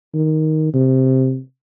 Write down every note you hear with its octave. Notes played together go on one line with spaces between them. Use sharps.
D#3
C3